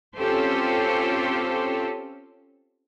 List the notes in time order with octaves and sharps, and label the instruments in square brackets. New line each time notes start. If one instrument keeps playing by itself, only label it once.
[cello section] C4 C#4 F4 G4 A4 C5